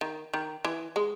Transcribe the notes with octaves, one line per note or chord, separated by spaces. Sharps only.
D#3
D#3
E3
G#3